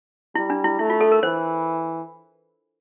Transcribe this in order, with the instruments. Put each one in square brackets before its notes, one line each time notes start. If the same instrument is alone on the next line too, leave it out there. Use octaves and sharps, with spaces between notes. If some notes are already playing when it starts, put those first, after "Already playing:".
[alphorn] G3 [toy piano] E4
[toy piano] D4
E4
[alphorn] A3 [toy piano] E4
[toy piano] F4
A4
A#4
[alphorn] E3 [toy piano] C5